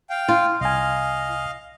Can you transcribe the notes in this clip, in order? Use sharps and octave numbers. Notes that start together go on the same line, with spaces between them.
F5 G5
F4
C2 D#5 F5 G#5